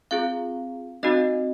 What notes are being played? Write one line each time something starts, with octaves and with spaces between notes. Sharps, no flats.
C4 F4 G#4 F5
C4 D#4 F#4 D#5